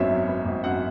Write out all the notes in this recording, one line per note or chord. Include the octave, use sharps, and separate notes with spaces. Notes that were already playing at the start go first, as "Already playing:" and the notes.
Already playing: G#1 F#2 B3 C#5 E5
F#3
B3
G#1
F#2 F#5